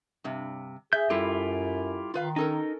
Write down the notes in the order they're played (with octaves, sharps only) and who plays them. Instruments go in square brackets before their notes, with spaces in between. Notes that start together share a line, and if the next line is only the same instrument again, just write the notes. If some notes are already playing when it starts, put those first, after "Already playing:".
[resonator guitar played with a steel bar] G2 C3
[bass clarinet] G#4 [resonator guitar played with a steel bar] E5 [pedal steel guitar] G6
[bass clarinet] F#2 [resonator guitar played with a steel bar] G3 A4 [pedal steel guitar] E4 F4 G4
[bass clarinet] D#3 [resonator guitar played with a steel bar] F4 B4 F5
[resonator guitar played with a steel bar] C#4 A4 A#4 [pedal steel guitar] D#4